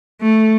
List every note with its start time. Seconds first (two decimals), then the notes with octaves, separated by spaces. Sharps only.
0.22 A3